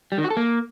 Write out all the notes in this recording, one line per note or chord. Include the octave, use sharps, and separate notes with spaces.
G3
D#3
F#4
A4
A#3